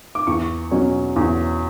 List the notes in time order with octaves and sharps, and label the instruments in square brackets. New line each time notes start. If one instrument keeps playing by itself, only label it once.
[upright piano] D6
E2 C#6
B2 F#3 C#4
E2